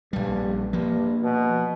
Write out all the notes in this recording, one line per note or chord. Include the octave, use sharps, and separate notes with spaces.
A#1 G2 G3
G2 F3 A#3
B2